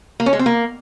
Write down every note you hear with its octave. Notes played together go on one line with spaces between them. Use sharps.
A#3
C#4
G#3
C4
A#3